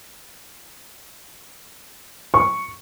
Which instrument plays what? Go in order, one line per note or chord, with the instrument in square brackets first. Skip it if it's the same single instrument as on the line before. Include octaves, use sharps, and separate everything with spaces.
[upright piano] C#6